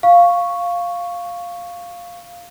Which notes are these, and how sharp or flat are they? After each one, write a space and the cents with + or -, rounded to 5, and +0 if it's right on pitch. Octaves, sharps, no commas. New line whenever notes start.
F5 +0 C#6 +0